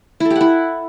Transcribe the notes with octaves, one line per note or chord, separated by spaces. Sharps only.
E4
A4
G4
F#5
E4